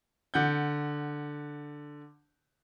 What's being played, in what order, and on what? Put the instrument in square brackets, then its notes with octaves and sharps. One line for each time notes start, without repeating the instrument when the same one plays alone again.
[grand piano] D3 F#5 G6